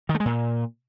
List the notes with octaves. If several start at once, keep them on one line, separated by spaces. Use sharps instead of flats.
D#3
A3
G#3
A#2